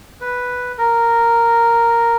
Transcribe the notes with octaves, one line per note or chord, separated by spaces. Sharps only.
B4
A#4